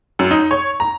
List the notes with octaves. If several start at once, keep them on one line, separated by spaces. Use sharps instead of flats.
F#2
D#4
C#5
A#5